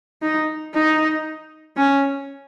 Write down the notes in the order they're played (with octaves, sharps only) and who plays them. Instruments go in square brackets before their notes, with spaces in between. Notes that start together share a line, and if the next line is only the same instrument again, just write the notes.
[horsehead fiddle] D#4
D#4
C#4